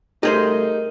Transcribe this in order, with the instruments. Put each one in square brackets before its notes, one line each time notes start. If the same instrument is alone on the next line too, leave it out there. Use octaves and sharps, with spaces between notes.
[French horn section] C#3 G3 A3 [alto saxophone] D#4 [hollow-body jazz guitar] G4 G#4 C5 [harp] A#4